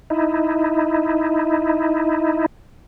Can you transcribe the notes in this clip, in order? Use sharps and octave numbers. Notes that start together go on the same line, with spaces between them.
D#4 E4